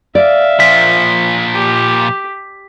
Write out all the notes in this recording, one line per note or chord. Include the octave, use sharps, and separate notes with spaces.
D5 E5 F5
A#2 F3 B6
G4